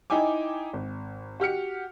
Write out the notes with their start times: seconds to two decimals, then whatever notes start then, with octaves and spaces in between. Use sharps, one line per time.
0.10 D#4 E4 G5 G#5 D6
0.73 G#1
1.40 F#4 G4 F6 C#7